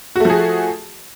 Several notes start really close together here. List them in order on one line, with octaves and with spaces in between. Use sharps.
F#4 A3 F3 G#4